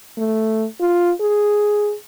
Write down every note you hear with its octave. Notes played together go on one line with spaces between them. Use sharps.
A3
F4
G#4